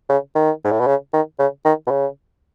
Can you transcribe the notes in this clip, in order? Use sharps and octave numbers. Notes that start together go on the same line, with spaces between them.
C#3
D#3
G#2
A2
B2
C#3
D#3
C#3
D#3
B2
C#3